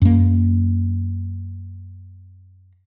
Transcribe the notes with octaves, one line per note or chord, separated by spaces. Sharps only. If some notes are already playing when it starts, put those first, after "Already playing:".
F#2 A#3